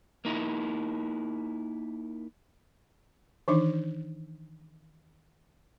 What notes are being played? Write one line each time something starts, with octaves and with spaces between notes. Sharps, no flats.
A#3 D#4 E4
D#3 E3 D4 D#4